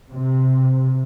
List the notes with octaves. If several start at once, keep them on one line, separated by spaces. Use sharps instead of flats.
C3